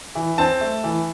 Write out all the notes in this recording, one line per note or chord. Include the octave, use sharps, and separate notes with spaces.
E3
C4 A5
A3
E3